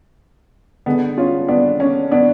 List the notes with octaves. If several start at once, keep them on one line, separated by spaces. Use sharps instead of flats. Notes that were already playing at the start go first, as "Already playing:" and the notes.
D3 G#3 B3
C#4 F4
B3 D4
C#4
B3 D4